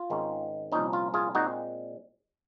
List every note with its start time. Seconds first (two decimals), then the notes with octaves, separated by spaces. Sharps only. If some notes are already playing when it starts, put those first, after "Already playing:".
Already playing: F4
0.10 G#1 G#2 D#3 G#3 C#4
0.72 C2 A#2 F3 A#3 C#4 D#4
0.93 F4
1.14 F4 G#4
1.35 A#2 G#3 C4 D#4 F#4